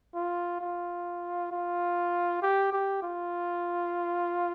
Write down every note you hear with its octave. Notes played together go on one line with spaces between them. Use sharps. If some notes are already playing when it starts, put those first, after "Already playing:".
F4
F4
F4
G4
G4
F4